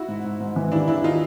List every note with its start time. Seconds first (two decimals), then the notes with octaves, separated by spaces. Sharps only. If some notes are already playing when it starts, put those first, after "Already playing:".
Already playing: E4 F#4
0.08 G#2
0.24 G#2
0.40 G#2
0.56 E3
0.72 D#2 D4 E4
0.88 D#2 D4 E4
1.04 D#4 F4